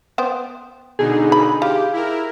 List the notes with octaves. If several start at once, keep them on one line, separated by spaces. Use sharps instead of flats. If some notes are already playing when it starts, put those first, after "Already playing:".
B3 C5 G5
B2 D3 D#4 G#4
B5
F4 G4 F5
E4 A#4